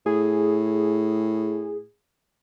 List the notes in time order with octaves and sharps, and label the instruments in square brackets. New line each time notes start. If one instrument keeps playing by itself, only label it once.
[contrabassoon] A2 [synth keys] G#4